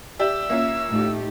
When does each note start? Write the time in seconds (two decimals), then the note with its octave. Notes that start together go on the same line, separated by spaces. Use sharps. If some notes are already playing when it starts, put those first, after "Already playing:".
0.19 G4 D5 E5 E6
0.50 A#3 C#4 F4 E5
0.90 A2 A3 D#4 G4